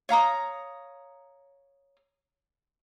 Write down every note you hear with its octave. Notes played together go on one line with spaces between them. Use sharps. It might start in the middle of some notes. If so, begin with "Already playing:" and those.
C#5 F5 A#5 D#6